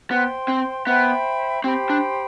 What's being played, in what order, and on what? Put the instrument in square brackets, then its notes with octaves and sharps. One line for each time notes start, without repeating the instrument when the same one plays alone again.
[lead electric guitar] B3 [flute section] C5 G5 C6
[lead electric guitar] C4
[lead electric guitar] B3 [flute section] C5 E5 G5 B5
[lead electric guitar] C4 [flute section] G4 C5 G5 B5
[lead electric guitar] D4